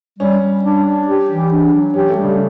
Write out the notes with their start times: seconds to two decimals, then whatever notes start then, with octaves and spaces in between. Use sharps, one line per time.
0.19 G3 C#4
0.41 G3
0.63 D4
0.85 D4
1.07 G4
1.29 E3
1.51 D4
1.73 F#3
1.94 C#4 G4
2.09 A3
2.16 G3
2.24 C#3